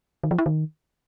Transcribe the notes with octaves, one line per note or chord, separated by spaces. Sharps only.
D#3
F3
E4
D#3